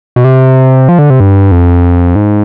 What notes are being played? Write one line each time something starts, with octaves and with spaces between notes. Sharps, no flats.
B2
C3
F3
D3
C3
G2
F2
G#2